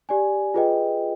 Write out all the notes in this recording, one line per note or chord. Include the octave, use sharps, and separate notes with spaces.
G4 D5 G#5
F4 G#4 B4 D#5 G5